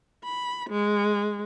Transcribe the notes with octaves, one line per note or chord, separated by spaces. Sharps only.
B5
G#3